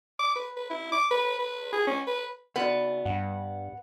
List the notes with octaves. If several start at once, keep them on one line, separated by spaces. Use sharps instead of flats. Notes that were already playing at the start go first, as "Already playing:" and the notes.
D6
B4
B4
E4
D6
B4
B4
G#4
C#4
B4
C#3 B3 F#4 D5
G2 F#5